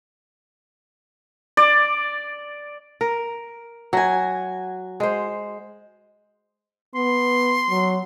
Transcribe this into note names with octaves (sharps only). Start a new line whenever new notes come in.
D5
A#4
F#3 F#4 G#5
G#3 C5
B3 C6
F#3